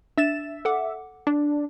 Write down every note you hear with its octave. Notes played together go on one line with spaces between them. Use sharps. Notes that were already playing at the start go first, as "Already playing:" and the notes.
D4 E5 A6 E7
A4 F#5 D6
D4